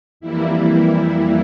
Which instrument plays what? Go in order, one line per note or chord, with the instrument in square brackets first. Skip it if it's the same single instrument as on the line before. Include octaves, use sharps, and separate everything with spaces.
[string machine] F2 E3 G3 A#3 E4